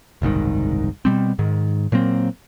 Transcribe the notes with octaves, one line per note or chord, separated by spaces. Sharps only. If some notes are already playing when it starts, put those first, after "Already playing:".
F#1 C2 G#2 D#3
B2 G3 C4
G#2 D#3
A#2 F#3 A#3 C4